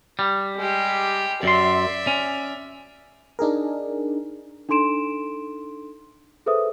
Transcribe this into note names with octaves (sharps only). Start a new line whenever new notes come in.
G3
G#3 G4
F#2 D5 E5 C6
C#4
D4 D#4 G#4 A#4
D4 D#4 A4 C6 D7 E7
G#4 A4 B4 C5 E5 D#6